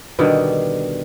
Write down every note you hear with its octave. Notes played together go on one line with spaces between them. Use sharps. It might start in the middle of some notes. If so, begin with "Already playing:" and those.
B2 D3 D#3 G3